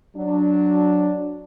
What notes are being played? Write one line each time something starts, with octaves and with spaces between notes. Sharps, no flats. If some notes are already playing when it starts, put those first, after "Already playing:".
F#3 D4